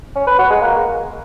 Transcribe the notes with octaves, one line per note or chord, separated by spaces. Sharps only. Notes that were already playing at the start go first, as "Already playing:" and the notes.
C#4
B4
F#4
G#3
A#3